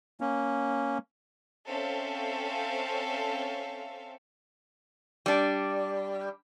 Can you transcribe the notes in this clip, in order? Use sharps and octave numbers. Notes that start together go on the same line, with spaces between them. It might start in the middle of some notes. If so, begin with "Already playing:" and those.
A#3 C#4
C4 C#4 A4 E5 F5
G3 D4